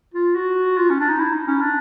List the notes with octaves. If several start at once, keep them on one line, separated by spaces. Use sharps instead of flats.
F4
F#4
F4
C#4
D4
D#4
E4
D#4
C#4
D4